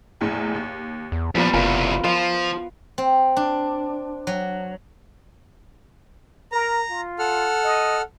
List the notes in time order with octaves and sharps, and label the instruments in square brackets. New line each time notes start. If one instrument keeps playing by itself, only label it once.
[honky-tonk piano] A#1 E2 A2
D#2
[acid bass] E2
[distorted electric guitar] E2 G3 [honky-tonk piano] A#2 F4 A#5 [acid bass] F3 [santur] B3
[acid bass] F#1 [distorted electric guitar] E2 C3 [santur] F4 F5 [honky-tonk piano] A#4
[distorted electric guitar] F3 [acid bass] F4 [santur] F5
[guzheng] C4
D4
F#3
[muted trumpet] A#4 [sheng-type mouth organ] A#5
[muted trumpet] F4
[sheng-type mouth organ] A4 F#5 F6
[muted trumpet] D#5